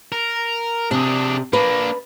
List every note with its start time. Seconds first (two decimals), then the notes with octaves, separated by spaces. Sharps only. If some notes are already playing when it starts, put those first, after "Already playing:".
0.12 A#4
0.91 C3 D4 G#4
1.53 A#3 D4 B4